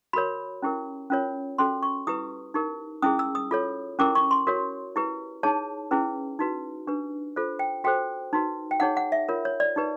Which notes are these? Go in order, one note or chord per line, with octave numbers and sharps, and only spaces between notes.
F#4 A#4 C#5 B5
C#4 E4 G4 A#4
C#4 F4 A#4 C#5
C#4 F#4 A4 C6
C#6
E4 G4 B4 D#6
D#4 G4 A#4
C#4 E4 G#4 D#6
E6
D#6
F4 A4 C#5
C#4 E4 G4 A#4 D6
C#6
C6
F#4 A#4 C#5
E4 G4 B4
D#4 G#4 C#5 A5
C#4 E4 G#4 B4
D#4 F#4 B4
D4 G4 B4
F4 A4 C5
G5
F#4 A4 C5 G5
D#4 F#4 B4
G5
D#4 G#4 C#5 F#5
F#5
E5
F4 A#4 C#5
C#5
D5
D#4 G4 B4